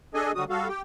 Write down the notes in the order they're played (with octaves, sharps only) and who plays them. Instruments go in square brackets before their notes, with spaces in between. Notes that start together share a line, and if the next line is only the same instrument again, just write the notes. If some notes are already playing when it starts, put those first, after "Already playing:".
[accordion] D4 G#4 A4 D#5 G#5
D2 D3 F#3 G3 F#4 D#6
G3 F#4 A4 F5
G4 G5